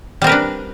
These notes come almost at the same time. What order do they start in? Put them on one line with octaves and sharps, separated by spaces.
G3 C4 A#4 B4 D4